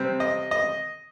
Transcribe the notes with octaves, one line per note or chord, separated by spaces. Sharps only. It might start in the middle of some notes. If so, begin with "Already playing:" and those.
Already playing: C3 G3 C4
D#5
D#5